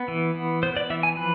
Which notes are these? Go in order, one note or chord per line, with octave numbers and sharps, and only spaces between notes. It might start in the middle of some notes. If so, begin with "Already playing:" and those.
Already playing: B3
E3
B3
B3 C5
D5
E3 E5
G#5
F3 B4